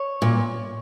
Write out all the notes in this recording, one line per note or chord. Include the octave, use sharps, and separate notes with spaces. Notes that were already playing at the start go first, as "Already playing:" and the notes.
Already playing: C#5
A#2